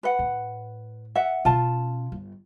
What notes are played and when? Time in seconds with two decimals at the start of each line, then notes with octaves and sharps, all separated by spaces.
0.03 B4 F#5
0.19 A2
1.15 E5 F#5
1.45 B2 C#4 F4 A5
2.12 G1